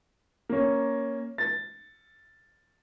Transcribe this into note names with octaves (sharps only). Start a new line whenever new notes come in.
A#3 C#4
A6